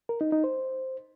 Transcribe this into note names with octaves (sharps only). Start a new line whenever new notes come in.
A#4
D#4
D#4
C5